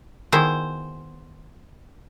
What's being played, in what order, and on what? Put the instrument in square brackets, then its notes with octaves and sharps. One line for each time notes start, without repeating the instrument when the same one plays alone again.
[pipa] B2 G#4 C5 [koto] D#3 B3 E4